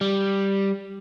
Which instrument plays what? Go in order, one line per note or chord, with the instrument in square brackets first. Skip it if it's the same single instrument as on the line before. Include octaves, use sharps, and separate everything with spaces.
[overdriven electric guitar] G3